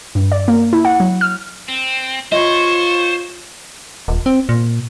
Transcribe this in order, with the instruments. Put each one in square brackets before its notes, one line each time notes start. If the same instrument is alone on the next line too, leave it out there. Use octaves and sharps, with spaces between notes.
[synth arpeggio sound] G2
D5
A#3
E4
F#5
F#3
F6
[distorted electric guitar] C4
[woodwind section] F4 [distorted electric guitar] C5 [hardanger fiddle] C#5 C#6 [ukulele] D#5 B5
[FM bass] D#1
C4
A#2